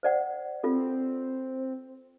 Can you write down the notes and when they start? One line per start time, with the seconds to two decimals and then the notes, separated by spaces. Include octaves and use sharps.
0.03 C5 D5 F#5
0.64 C4 F4 A4